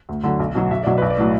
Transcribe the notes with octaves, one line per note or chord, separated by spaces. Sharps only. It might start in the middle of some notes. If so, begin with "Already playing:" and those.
D2
D3 F#3
B1
B2 F#3
B1 E5
B2 F#3 D5
B1 B4
D5
A2 F#3